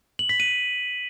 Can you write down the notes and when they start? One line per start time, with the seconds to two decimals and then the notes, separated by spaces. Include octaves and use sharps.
0.19 F#7
0.29 B6
0.40 D#7